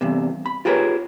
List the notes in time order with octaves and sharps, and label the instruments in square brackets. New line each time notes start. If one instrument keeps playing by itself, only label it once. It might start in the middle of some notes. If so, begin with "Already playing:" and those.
[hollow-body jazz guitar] E2 G2 C3
B5
F4 G4 G#4 A#4 B4 C#5